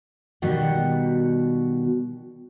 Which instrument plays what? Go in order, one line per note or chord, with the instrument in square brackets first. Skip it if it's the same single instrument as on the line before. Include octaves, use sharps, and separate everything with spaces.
[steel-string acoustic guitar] B2 D#3 G3 F#4 F#5